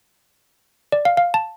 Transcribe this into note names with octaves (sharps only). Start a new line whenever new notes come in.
D5
F5
F5
A5